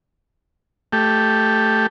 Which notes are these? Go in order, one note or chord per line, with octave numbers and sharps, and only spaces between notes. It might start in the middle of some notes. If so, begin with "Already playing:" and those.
A3 G4